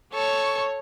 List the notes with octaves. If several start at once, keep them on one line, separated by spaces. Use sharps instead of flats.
A4 C#5 C#6